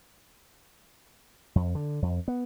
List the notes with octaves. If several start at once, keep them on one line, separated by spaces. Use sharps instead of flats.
F2
D3
F2
B3